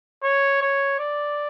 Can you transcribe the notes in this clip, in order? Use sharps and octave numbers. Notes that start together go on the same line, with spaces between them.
C#5
C#5
D5